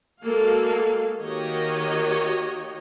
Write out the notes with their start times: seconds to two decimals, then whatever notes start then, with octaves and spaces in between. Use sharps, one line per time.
0.23 G#3 A#3 F#4 A4 F5
1.18 D#3 A#3 F#4 G4 C#5 D#5